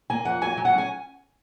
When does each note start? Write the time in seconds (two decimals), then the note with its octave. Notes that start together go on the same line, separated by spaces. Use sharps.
0.10 A#3 G#5
0.25 F2 F#5
0.41 F#3 G#5
0.57 F#3
0.65 F#5
0.73 C#4 G#5